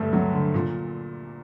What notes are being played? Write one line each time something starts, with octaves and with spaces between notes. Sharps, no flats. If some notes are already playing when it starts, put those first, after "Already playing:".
Already playing: D2 G2 A3
F#3
D3
A#2